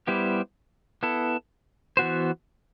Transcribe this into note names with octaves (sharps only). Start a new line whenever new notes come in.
G3 B3 E4 G4 C5
B3 E4 A4
E3 B3 F#4 C5